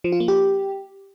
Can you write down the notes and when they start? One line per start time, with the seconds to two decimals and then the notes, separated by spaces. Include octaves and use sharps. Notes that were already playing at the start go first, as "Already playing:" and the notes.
0.04 F3
0.12 F4
0.20 A#3
0.28 G4